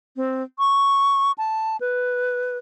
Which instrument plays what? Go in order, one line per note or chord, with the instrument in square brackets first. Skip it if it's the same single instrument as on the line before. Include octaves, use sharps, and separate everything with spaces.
[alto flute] C4
C#6
A5
B4